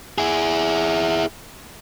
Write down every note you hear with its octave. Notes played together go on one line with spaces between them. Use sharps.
E4 G#4